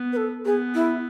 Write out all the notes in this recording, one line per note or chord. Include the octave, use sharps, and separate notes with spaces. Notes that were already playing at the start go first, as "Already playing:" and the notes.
Already playing: B3
B4
A4
B3 G#4
E4